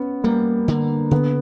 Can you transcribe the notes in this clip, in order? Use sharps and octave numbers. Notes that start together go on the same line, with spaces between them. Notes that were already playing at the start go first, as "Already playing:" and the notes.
Already playing: B3 C#4
G3 A#3
D3
C#3 B3